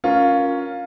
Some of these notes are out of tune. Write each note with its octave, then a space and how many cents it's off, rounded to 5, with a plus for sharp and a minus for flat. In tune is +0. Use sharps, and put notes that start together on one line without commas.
C#4 +5 F4 +15 A#4 +0